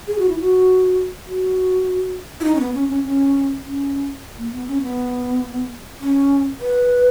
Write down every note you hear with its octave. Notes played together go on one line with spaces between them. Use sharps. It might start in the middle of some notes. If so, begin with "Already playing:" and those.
G#4
F#4
E4
F#4
F#4
E4
D#4
C#4
B3
C#4
C#4
C#4
C#4
A#3
B3
C#4
B3
C#4
B4